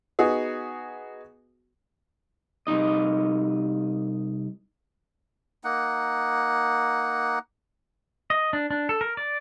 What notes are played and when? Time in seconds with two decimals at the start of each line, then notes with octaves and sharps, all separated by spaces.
0.19 B3 D#4 F#4 G#4
2.67 C2 A#2 D#4 D#5
5.64 A#3 D#4 F#5
8.30 D#5
8.53 D4
8.71 D4
8.89 A4
9.01 A#4
9.17 D5